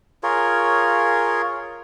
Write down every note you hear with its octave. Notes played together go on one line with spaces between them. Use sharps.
F4 G#4 A#4 C#5